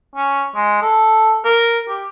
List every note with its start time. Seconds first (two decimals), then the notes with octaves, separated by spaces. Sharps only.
0.16 C#4
0.56 G#3
0.82 A4
1.44 A#4
1.89 G4